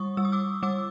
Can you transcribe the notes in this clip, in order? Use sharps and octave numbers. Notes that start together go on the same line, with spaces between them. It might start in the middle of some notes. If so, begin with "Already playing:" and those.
Already playing: G3 C#6 D#6
G3 E6
D#6
D6 E6
G3 D6 E6